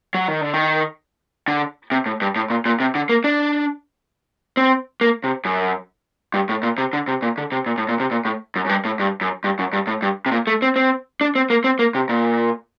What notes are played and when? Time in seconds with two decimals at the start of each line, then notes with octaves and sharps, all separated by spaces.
0.14 F#3
0.28 D#3
0.41 D3
0.54 D#3
1.48 D3
1.92 C3
2.06 A2
2.21 G2
2.36 A2
2.50 A#2
2.66 A#2
2.80 C3
2.95 D3
3.09 A#3
3.24 D4
4.57 C4
5.01 A#3
5.24 C3
5.45 F#2
6.34 G2
6.49 A2
6.63 A#2
6.78 C3
6.93 D3
7.08 C3
7.22 A#2
7.38 D3
7.52 C3
7.66 A#2
7.78 A2
7.89 A#2
8.00 C3
8.11 A#2
8.25 A2
8.56 F#2
8.66 F#2
8.69 G2
8.85 A2
9.00 G2
9.21 F#2
9.44 G2
9.59 F#2
9.73 G2
9.87 A2
10.02 G2
10.26 C3
10.32 A#2
10.47 A3
10.62 C4
10.76 C4
11.21 D4
11.35 C4
11.50 A#3
11.64 C4
11.79 A#3
11.95 C3
12.09 A#2